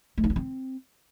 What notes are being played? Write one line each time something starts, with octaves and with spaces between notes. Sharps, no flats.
A3
D#4
C#4
C4